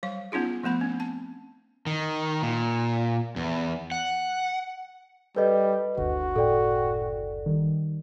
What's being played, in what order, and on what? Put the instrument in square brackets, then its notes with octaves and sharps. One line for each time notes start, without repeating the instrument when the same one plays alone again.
[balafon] F#3 G3 F5
B3 C#4 D#4 F4 G#4
F3 A3 B3 B5
C4 C#4
A5
[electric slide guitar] D#3
A#2
E2
F#5
[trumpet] G3 [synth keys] A4 G6 [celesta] B4 D#5
[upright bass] F#1 D2 [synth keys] D3 [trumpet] F#4
[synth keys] A2 G5 [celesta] A4 D5
[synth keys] D#3 G3